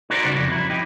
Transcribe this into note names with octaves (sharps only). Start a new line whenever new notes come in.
D#4 E4 F#4 A#4 C5 D5
C#3 G3 F#4
F2
E4
D#4 G4